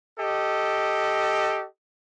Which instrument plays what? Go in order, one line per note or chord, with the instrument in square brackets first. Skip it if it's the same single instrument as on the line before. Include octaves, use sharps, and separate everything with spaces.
[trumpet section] G4 A4 D#5